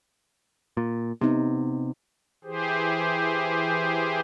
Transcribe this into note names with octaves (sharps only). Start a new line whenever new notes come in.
A#2
C3 B3 D#4
E3 G4 G#4 C5